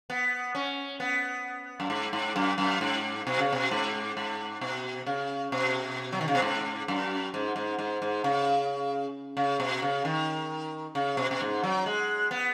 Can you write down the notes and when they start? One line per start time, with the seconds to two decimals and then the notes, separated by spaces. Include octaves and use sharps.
0.10 B3
0.55 C#4
1.00 B3
1.80 F#2
1.90 G#2
2.13 G#2
2.36 F#2
2.58 F#2
2.81 G#2
3.27 B2
3.39 C#3
3.52 B2
3.71 G#2
4.17 G#2
4.61 B2
5.06 C#3
5.52 B2
6.12 F#3
6.21 D#3
6.28 C#3
6.35 B2
6.42 G#2
6.88 F#2
7.34 G#2
7.56 G#2
7.79 G#2
8.02 G#2
8.24 C#3
9.37 C#3
9.60 B2
9.82 C#3
10.05 D#3
10.95 C#3
11.17 B2
11.31 B2
11.41 G#2
11.63 F#3
11.86 G#3
12.31 B3